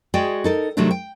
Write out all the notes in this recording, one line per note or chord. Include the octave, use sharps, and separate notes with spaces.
G#3 F#4 G#4 D5 G5
D#4 A4 A#4
C3 D#3 F#3 G3 A3 D4
G5